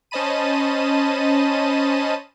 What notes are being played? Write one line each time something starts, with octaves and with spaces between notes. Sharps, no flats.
C#4 C5 D#5 A5 B5 D#7